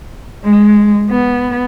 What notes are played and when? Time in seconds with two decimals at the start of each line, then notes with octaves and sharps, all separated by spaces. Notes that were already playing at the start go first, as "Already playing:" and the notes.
0.45 G#3
1.10 B3